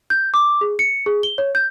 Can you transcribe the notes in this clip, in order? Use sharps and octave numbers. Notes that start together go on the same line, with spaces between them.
G6
D6
G#4
C#7
G#4
G7
C#5
G6